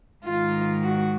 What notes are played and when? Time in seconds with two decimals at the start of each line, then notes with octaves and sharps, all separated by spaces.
0.25 G#2 D#3 F4
0.83 F#4